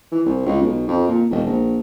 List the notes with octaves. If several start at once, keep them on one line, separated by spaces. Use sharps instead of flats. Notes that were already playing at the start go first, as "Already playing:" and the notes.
E3
C2
C#2
B1
F2
A#2
E1
A#1